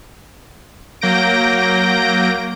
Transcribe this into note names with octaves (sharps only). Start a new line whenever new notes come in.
F#3 A#3 G6 A#6 D7